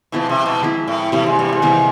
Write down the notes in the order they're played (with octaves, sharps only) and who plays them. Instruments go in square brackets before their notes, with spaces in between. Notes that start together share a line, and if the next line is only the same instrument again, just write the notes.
[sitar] B2 [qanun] F3 G#3 C4 E4
[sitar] C3
B2
[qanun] F3 G#3 C4 E4
[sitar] A2
[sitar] A2 [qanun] C3 E3 G3 A#3
[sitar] G#2
G2
G#2
[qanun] C3 E3 G3 A#3